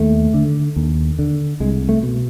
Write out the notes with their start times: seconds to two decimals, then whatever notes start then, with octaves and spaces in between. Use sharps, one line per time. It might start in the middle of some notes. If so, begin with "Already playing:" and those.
Already playing: D#2 A3
0.34 D3
0.76 D#2
1.19 D3
1.60 C2 G#3
1.89 A3
2.02 B2